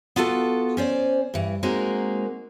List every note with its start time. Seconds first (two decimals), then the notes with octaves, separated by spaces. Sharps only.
0.16 B3 F4 F#4 A4
0.77 C#4 C5 D5
1.34 G2 E3
1.63 G#3 A#3 C4 D#4 F#4 A#4